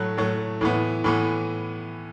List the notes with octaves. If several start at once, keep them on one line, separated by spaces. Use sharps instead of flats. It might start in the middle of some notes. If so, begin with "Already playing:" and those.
Already playing: A2 F#3 A3 F#6
A2 F#3 A3
A2 E3 B3
A2 E3 B3